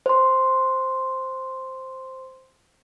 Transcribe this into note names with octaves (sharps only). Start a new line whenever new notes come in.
C5 C6